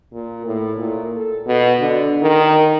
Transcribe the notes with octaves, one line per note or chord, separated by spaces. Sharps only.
A#2
A2
A#2
A4
B2
D3
D#3